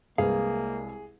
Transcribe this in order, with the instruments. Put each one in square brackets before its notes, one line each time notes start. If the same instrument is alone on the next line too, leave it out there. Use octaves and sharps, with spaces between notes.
[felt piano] C2 G#3 B4 [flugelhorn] A#3 [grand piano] G#4 [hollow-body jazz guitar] F5